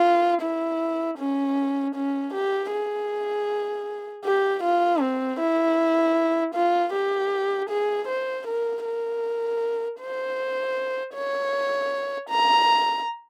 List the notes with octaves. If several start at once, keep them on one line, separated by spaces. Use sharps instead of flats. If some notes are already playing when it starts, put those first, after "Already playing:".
Already playing: F4
E4
C#4
C#4
G4
G#4
G4
F4
C4
E4
F4
G4
G#4
C5
A#4
A#4
C5
C#5
A#5